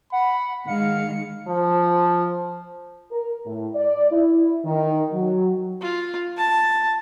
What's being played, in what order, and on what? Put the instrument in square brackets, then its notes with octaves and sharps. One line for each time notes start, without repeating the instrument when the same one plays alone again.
[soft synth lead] F#5 [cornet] B5
[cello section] D#3 G#3 [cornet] F5 [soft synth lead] C#7
[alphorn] F3
[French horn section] A#4
A2
D5
E4
D#3
F#3
[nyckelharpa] F4
A5